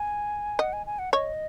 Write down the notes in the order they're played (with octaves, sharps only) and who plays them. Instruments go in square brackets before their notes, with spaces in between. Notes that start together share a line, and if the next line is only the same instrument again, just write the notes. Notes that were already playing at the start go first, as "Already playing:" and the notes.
Already playing: [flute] G#5
[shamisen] D#5 [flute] F#5
[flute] G#5
G#5
F#5
[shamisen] C#5 [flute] D#5